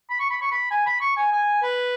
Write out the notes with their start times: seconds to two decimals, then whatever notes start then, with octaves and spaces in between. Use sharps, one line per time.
0.10 B5
0.20 C#6
0.30 B5
0.41 C#6
0.52 B5
0.71 G#5
0.86 B5
1.01 C#6
1.17 G#5
1.32 G#5
1.63 B4